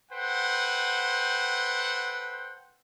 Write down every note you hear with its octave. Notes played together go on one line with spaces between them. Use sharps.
A4 B4 C5 F#5 G5